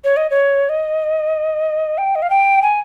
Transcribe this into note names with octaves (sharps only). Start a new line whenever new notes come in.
C#5
D#5
C#5
D#5
G5
D#5
F5
G5
G#5